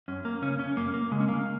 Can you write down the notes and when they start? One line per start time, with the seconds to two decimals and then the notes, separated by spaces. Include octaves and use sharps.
0.08 F#2 C#4
0.25 A#3
0.42 C#3 C#4
0.59 C#4
0.77 F#2 A#3
0.94 A#3
1.11 C#3 G#3
1.20 C#4
1.28 A#3